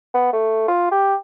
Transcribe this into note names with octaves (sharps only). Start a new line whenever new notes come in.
B3
A3
F4
G4